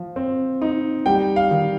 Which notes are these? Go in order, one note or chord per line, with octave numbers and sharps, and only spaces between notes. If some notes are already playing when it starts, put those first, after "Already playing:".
Already playing: F3
C4
D#4
G3 G5
F5
D#3